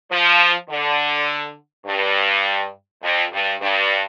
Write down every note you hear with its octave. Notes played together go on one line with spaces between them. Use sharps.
F3
D3
G2
F2
G2
G2